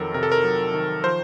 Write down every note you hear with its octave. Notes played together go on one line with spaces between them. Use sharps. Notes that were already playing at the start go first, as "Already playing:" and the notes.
Already playing: F2 D#3 F#3 A4 A#4
C3 A#4
A4
A#4
F#3
D#3
F3 C5